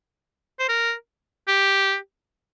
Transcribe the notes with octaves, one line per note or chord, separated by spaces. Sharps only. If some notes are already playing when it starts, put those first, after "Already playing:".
C5
A#4
G4